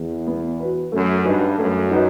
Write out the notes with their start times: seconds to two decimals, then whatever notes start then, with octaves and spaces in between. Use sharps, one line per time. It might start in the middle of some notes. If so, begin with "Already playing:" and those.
Already playing: E2
0.27 B3
0.60 F#4 B4
0.92 F#2 A3
1.25 G2 D#4 F#4 B4 D#5
1.58 F#2 A3
1.91 D#4 F#4 B4 D#5